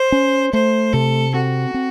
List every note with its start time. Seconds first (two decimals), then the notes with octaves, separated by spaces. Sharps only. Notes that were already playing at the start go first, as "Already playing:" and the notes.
Already playing: C5
0.12 C#4
0.53 A3 C5
0.93 C3 A4
1.34 C4 F#4
1.74 C4